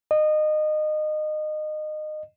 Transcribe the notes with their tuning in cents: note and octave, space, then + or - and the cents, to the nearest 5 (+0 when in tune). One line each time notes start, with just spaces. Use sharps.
D#5 -25